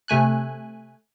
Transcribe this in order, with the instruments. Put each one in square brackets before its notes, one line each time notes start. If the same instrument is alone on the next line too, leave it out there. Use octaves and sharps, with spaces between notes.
[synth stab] C3 A3 G#5 F#6